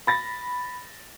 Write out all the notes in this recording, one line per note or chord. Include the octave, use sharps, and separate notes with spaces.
B5 A6 A#6